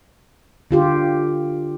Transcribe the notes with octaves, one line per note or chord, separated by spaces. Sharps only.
D3 F4 G4